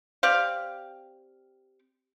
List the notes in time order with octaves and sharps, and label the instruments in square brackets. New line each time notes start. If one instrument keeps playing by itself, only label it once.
[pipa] C4 G4 D5 F5